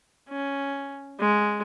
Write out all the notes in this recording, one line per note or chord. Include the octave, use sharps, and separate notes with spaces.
C#4
G#3